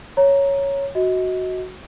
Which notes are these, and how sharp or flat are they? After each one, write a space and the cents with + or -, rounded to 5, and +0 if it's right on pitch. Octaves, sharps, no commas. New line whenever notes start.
C#5 +0 A#5 +0
F#4 +0 D#5 +30